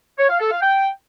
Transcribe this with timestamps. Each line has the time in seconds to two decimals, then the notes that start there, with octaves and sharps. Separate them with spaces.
0.18 C#5
0.29 F5
0.40 A4
0.50 F5
0.61 G5